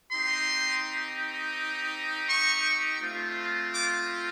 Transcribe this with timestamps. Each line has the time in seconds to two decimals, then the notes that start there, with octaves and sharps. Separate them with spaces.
0.11 C4 D#4 G4 C6
2.28 C#6
3.00 A3 C4 F4
3.72 D6